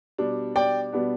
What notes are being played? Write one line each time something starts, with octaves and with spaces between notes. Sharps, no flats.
B2 G3 D4
D5 G5
B2 G3 B3 D4